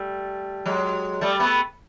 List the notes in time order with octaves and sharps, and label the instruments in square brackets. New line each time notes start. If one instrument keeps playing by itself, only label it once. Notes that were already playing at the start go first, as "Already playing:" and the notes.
Already playing: [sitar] G3 A3
F#3 G#3
G3 A3
A3 B3